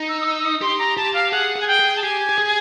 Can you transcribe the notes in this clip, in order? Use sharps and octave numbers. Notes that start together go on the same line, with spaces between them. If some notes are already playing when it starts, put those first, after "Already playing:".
Already playing: D#4
E6
D#6
E6
D#6
G4 C6
A#5
G4 A5
F5
G#4 F#5
G#4
G#5
G5
G#4
A5
G4 G#5
G4
G#4